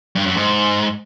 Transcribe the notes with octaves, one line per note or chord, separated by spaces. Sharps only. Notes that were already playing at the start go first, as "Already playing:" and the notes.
G2
F#2
G#2